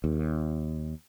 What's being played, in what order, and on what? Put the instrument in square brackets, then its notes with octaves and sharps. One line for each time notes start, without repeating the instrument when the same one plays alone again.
[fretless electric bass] D#2